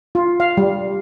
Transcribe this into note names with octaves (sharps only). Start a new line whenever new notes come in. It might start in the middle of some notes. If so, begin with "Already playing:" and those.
F4
F5
G3